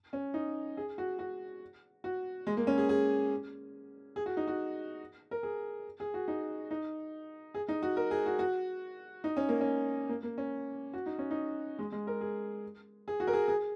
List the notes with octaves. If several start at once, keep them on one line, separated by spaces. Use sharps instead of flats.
C#4
D#4
G#4
F#4
F#4
F#4
G#3
A#3
C#4
G#4
G#4
G#4
F#4
D#4
F#4
A#4
G#4
G#4
F#4
D#4
D#4
G#4
D#4
F#4
A#4
G#4
F#4
F#4
D#4
C#4
A#3
C#4
A#3
A#3
C#4
F#4
D#4
C#4
D#4
G#3
G#3
A#4
G#4
G#4
F#4
A#4
G#4
G#4